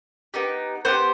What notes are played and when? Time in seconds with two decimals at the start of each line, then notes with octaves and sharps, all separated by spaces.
0.34 B3 D#4 G4
0.85 B3 D#4 G4 C5